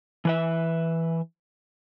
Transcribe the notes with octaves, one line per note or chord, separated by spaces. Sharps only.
E3 B4 E5